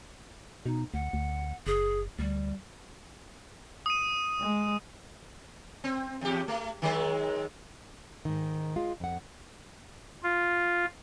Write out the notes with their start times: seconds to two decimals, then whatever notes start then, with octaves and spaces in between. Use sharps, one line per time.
0.66 B2 D#4
0.94 D2 F#5
1.13 D2
1.67 F#1 G#4
2.19 D2 G3
3.86 D#6 D#7
4.40 G#3
5.84 C4
6.21 E2 G4
6.48 A3
6.82 D#3 F#3 G#3
8.25 G#2 D#3
8.76 G#3 F4
9.00 F2 F#5
10.23 F4